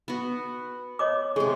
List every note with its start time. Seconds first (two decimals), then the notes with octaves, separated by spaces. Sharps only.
0.08 B3 F#4
0.99 C#5 D#5 D6
1.36 C3 G#3 G#4